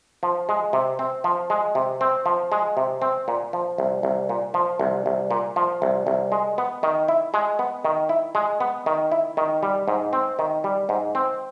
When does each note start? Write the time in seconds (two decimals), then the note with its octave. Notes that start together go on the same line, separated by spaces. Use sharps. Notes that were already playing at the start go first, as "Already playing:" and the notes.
0.23 F3
0.49 G#3
0.73 C3
0.99 C4
1.24 F3
1.50 G#3
1.75 C3
2.01 C4
2.26 F3
2.52 G#3
2.77 C3
3.02 C4
3.28 A#2
3.53 F3
3.78 C2
4.03 C2
4.29 A#2
4.54 F3
4.80 C2
5.06 C2
5.31 A#2
5.56 F3
5.82 C2
6.07 C2
6.32 G#3
6.58 B3
6.83 D#3
7.08 E4
7.34 G#3
7.59 B3
7.85 D#3
8.09 E4
8.35 G#3
8.60 B3
8.86 D#3
9.12 E4
9.37 D#3
9.63 G3
9.88 G#2
10.13 C4
10.39 D#3
10.64 G3
10.89 G#2
11.15 C4